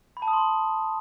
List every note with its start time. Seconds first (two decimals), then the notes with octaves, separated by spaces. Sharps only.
0.17 B5
0.22 A5
0.28 D#6
0.33 C6